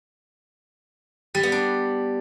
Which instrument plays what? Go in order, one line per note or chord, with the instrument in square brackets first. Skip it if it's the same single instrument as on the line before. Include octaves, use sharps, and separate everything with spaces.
[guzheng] G3
B3
D4